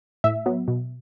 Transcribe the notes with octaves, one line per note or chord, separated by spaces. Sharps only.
A2 E5
F#3 B3
B2